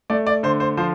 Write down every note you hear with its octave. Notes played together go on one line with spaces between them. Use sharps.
A3 D5
D5
D3 C5
C5
F3 C5